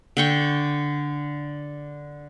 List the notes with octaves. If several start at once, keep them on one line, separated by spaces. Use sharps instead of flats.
D3 G5 C#6